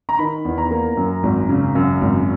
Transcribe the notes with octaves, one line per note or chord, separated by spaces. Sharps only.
A#5
D#3 B5
E2
A#5
A#3
F#2
G#1
C#3
F#2
G#1